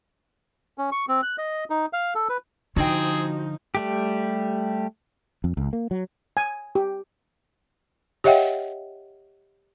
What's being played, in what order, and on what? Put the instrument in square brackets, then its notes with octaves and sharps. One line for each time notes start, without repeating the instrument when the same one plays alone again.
[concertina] C#4
C#6
C4
F#6
D#5
D#4
F5
A4
B4
[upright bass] D3 [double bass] F3 D#4 [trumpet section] C4 G#4 [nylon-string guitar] F#4 G5
[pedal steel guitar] G3 A3 G4
[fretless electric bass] F2
C#2
A#3
F#3
[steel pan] G#5
G4
[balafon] G4 C#5 D#5 E5 F#5 G5